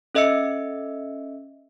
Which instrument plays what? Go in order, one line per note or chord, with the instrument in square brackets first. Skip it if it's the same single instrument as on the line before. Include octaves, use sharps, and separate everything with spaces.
[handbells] C#4 A4 D#5 E5 E6 C#7